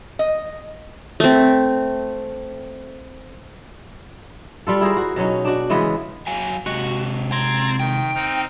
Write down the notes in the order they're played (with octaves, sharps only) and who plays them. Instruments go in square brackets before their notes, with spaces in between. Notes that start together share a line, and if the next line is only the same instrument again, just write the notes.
[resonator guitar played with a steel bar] D#5
[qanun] A3 C4
[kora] G3 F4 A4
E4 G#4 A#4 C5
F#4
B2 F#3 C#4 D#4
D4 F#4
C#3 E3 G#3 B3
[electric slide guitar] F#3 F5 G#5
[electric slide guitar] C3 G#3 D#5 [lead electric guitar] F#4
[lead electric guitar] C4 [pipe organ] A#5 G#6 A6
[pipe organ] D#3 [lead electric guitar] G5
[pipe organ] C4 D#4 F6